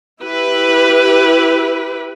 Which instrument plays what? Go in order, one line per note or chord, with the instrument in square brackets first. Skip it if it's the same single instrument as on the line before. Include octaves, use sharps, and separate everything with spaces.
[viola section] E4 G4 B4